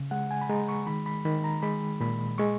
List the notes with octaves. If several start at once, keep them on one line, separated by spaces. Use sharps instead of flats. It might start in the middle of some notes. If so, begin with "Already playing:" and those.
Already playing: C#3
G#3 F#5
G#5
B5
G#3 A#5
C#6
D#3 B5
B5
D#3 B5
A#5
G#3 B5
A#2 B5
G#3 C#6